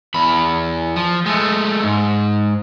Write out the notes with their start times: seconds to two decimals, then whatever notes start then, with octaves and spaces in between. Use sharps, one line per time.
0.14 E2 B5
0.96 F3
1.26 G#3 A3
1.83 G#2